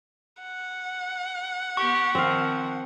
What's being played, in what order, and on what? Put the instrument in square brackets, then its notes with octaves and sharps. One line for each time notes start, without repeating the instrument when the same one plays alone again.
[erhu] F#5
[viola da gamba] B3 G4 [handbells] C#6
[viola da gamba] D#3 F3 [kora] C4 F5